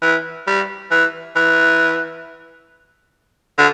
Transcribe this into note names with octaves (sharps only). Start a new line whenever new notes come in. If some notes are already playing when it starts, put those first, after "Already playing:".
E3
G3
E3
E3
D3